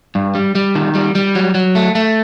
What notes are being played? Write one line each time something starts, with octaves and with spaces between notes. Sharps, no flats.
G2
G3
G3
D#3
G3
G3
F#3
F#3
A3
A3